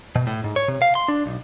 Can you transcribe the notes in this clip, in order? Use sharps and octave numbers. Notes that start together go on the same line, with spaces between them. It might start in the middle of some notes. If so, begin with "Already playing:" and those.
B2
A2
G#2
C#5
C3
F5
C6
D4
B1